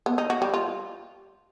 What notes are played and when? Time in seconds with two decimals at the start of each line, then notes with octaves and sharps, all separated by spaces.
0.06 B3
0.18 D#4
0.30 F#4
0.42 G3
0.54 F4